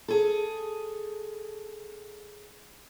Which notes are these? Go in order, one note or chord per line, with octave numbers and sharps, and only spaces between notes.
G#4 A4